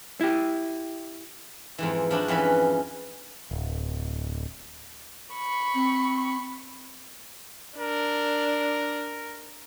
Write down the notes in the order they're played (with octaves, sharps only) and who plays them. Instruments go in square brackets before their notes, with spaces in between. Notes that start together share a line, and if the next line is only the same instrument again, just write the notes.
[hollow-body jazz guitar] E4 G4
[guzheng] F2 G#2 E3
F3 D4 E4 F#4
F2 E3 C#4 B4
[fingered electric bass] D1
[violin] B5 C#6
[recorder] C4
[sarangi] D4 [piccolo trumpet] A#4